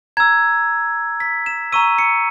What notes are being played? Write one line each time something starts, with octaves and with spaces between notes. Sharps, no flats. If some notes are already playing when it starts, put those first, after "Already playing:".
A#5 E6 G#6
B6
E7
A#5 C#6 E6 D#7
C#7